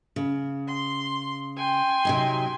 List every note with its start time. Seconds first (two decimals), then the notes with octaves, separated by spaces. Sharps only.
0.16 C#3
0.67 C6
1.57 G5 G#5 C6
2.05 C3 F#3 D#4